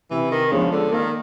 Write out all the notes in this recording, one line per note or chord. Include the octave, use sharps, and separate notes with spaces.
C3 E3
D#3
C#3 F3 G#3 B3 D4
D3
D#3 A#3